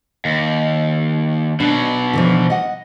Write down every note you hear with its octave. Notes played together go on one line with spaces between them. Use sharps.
D#2
B2 F#3 D4
D3 E3 F3
D#5 F#5